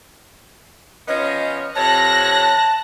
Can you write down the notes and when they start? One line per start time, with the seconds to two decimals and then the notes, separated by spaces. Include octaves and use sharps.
1.08 F3 B3 C#4 D#5
1.75 F2 C3 C#5 A5 F#6 A#6
2.31 A5